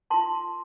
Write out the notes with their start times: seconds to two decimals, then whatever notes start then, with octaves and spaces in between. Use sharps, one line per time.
0.10 F4 A#4 A5 C6